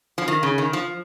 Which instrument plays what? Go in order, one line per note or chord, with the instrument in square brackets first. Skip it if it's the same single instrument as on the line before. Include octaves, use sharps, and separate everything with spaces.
[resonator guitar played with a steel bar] F3
D#3
C#3
D#3
F3